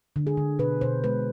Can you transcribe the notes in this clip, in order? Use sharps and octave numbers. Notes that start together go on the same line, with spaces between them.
D3
G#4
D3
B2 B4
B2 C5
G#3 B4